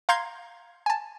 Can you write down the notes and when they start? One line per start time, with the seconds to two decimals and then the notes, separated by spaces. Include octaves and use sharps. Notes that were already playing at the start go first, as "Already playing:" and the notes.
0.09 F5 A#5 C6 G6 G#6 C7
0.86 G#5 A5